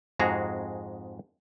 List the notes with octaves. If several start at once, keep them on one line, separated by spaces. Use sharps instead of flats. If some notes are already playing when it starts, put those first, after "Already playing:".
F2 G#2 G#3 F#4 G#4 A#5